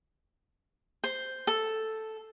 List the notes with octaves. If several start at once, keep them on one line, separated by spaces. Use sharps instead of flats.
C5
A4